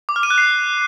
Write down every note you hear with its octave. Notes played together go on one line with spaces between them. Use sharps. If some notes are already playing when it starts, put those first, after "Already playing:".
D6
F6
D#7
F#6
C7